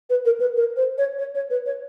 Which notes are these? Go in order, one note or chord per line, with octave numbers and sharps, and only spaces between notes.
B4
A#4
B4
A#4
C5
C#5
C#5
C#5
B4
C#5